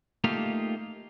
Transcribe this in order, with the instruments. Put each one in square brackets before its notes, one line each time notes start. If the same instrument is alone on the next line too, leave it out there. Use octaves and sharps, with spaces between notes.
[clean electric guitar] A3 A#3 D#4 F4 G4 F5